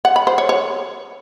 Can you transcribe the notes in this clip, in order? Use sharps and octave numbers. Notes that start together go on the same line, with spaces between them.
F#5
B5
C5
C#5
C#5